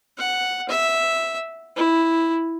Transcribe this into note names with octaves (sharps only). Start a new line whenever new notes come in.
F#5
E5
E4